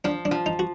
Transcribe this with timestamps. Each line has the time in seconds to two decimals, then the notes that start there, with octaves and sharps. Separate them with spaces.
0.04 F3 D4
0.25 D4
0.31 F3
0.46 D#4
0.59 F#4